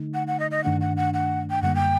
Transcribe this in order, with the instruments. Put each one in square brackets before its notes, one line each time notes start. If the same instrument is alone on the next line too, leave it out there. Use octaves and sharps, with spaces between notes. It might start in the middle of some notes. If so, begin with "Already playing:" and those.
Already playing: [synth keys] D3 A3 D#4
[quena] F#5
F#5
D#5
D#5
[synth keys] G2 D#3 A3 D4 [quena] F#5
[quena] F#5
F#5
F#5
G5
[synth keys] F#2 D3 G3 A#3 [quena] F#5
[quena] G5